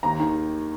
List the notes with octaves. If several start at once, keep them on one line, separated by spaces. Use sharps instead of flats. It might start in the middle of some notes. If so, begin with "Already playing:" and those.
D#2 A#5
D#3